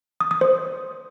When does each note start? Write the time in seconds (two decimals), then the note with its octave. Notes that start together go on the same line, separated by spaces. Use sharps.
0.20 D#6
0.31 D#6
0.41 C5